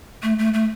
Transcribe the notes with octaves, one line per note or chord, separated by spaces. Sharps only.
A3
A3
A3